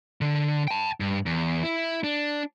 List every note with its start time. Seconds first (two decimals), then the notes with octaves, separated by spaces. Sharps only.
0.21 D3
0.68 G5 A5
1.00 G2
1.26 E2
1.63 E4
2.04 D4